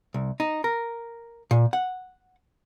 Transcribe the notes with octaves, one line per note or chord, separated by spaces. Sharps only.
C2
D#4
A#4
A#2
F#5